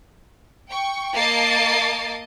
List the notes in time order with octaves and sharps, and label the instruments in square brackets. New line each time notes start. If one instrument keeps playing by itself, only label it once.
[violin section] G5 C#6
A#3 D#5 A5 D6 A6 C7